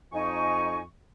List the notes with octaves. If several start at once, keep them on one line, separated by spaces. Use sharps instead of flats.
F2 D#4 G#5 C#6